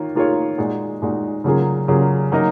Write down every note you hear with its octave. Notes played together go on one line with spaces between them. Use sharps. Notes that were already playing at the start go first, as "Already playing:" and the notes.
Already playing: D#3 A#3 F4 C#5
D#3 A#3 F4 G#4 C#5
A#2 G#3 D#4 F#4
A#2 G#3 D#4 F#4
C#3 F#3 A#3 F4 G#4
C#3 F#3 A#3 F4 G#4
F#3 A#3 D#4 A#4 D#5